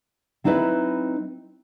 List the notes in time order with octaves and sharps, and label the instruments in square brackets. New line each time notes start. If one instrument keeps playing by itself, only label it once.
[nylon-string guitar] F#3 C4 D#4 E4 B4 D#5